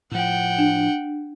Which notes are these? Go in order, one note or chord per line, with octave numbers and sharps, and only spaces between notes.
A2 F3 F#5 G5
D4